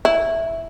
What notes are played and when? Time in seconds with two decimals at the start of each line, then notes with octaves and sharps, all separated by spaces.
0.05 E4